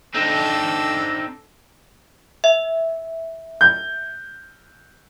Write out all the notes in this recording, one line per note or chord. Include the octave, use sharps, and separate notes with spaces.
C4 D4 D#4 A4
E5
G6